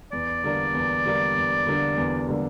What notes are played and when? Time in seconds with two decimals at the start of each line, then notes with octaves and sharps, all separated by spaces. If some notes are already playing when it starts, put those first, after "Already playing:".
0.12 E2 D5
0.43 D3 G3 A#3 D4
0.74 E2
1.04 D3 G3 A#3 D4
1.36 E2
1.67 D3 G3 A#3 D4
1.98 E2
2.28 D3 G3 A#3 D4